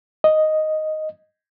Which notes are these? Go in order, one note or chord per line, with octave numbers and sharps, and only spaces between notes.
D#5